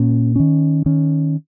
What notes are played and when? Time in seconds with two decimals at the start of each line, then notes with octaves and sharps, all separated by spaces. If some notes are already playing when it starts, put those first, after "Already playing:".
Already playing: A#2 A#3 C#4
0.36 D#3 C#4
0.86 D#3 C#4